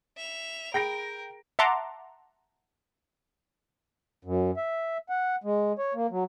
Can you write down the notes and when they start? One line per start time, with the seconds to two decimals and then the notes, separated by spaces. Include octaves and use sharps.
0.17 E5 F7
0.74 G#4 A#4 G5 B5 G6 A#6 D7
1.59 E5 F#5 A5 A#5 C6 D6
4.25 F#2
4.57 E5
5.09 F#5
5.44 G#3
5.79 C#5
5.94 A#3
6.11 F#3